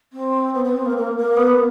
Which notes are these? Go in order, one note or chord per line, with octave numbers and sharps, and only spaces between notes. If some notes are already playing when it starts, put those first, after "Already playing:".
C4
B3
B3
C4
A#3
A#3
A#3
B3